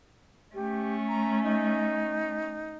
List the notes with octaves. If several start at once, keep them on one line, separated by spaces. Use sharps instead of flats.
A3 C#4 G4
A#5
D#4